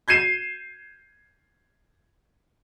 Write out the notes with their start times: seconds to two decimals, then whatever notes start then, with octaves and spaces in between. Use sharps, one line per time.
0.08 G6 G#6 C7 D#7 E7